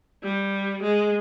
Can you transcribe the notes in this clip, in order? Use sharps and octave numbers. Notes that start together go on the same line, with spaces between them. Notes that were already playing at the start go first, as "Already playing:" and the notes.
G3
G#3